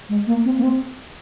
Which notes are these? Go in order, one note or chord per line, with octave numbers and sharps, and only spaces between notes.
G#3
A#3
C4
A#3
C4